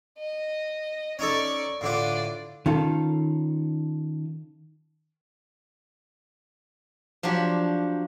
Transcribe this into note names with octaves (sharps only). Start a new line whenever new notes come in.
D#5
C#4 D#4 A4 D5 C#6
A2 D3 D4 F4 D5
D#3 C#4 F4 A4
F3 F#3 D4 G4